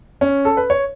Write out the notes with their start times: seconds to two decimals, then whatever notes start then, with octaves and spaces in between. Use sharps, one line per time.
0.21 C#4
0.45 A4
0.57 B4
0.70 C#5